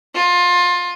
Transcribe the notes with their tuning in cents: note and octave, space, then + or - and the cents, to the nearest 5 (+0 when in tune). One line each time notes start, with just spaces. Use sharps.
F4 +20